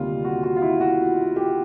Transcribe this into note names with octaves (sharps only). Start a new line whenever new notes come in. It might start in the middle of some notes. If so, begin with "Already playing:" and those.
Already playing: D2 C3 D#3 G3 A#3 F4
F#4
F#4
F4
E4
F#4
G4